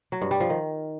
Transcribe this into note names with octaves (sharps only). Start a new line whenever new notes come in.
F#3
G2
G3
F3
D#3